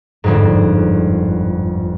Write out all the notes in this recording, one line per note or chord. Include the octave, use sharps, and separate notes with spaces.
G1 F2 G#2